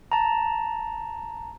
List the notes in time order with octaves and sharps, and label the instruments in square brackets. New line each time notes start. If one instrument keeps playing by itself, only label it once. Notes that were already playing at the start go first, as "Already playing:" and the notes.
[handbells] A5 A#5